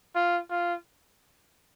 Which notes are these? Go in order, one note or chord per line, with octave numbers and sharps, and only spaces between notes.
F4
F4